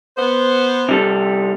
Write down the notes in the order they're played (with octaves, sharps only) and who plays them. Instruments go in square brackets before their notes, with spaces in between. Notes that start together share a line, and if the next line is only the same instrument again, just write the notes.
[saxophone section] B3 C5
[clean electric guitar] C3 G3 A4